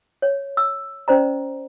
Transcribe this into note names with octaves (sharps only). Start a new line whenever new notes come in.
C#5
E6
C#4 C5 D5 A#5